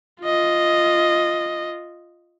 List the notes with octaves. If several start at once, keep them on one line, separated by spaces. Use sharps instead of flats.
F4 D#5